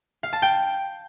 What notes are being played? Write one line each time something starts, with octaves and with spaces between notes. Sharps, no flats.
F5
A5
G5